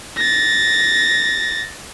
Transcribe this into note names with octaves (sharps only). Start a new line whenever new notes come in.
A6 A#6